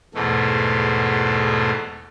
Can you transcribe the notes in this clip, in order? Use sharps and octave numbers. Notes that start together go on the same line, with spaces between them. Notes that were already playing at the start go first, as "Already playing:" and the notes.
E2 G#2 B2 A3